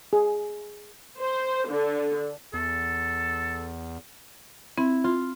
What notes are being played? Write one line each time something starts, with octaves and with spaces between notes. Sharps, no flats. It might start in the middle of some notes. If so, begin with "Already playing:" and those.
G#4
C5
D3
E2 A4
C4 E4
F4